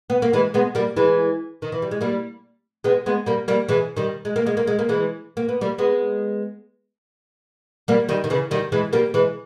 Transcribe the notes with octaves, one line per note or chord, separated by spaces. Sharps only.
B3
A#3
E3 G#3
G#3 B3
G3 A#3
E3 G#3
D#3
E3
G3
G#3
G3 A#3
G#3 B3
G#3 B3
G3 A#3
G3 A#3
E3 G#3
D#3 G3
G#3
A#3
G#3
A#3
G#3
A#3
E3 G#3
A#3
B3
G3 A#3
G#3 B3
G3 A#3
D#3 G3
D#3
C#3 E3
D#3 G3
E3 G#3
G3 A#3
E3 G#3